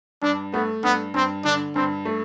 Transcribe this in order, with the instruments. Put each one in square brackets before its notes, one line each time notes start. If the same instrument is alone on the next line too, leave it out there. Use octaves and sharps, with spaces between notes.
[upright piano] G2 [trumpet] D4
[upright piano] A3 [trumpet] B3
[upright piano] G2 [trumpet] B3
[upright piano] G2 [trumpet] C4
[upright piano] D3 [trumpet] D4
[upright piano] G2 [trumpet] C4
[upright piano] A3